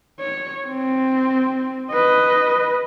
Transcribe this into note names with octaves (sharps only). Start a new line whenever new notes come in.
C#5
C4
B4 D#5